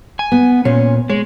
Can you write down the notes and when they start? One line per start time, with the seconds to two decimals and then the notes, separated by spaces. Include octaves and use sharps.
0.19 G#5
0.32 B3
0.65 A#2 C#4
1.10 G#3 C#5